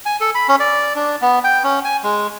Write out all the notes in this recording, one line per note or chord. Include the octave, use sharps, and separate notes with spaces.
G#5
A4
B5
C#4
D5
D4
B3
G5
C#4
G#5
G#3